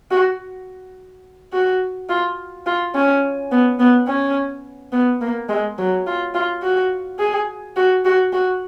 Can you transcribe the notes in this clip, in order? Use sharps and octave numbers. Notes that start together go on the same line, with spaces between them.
F#4
F#4
F4
F4
C#4
B3
B3
C#4
B3
A#3
G#3
F#3
F4
F4
F#4
G#4
F#4
F#4
F#4